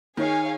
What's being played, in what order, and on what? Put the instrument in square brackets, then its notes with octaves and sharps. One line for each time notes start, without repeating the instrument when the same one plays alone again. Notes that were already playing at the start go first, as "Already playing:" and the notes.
[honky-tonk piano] D#3 [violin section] G#4 C#5 F5 G#5